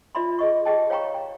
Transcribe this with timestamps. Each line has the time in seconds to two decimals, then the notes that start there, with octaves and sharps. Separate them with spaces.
0.15 F4 D5 E5 B5 C6
0.39 G#4 D#5 C#6
0.65 G4 G#4 D#5 G5 A5
0.90 C#5 F5 G5 A#5 C#6
1.14 G5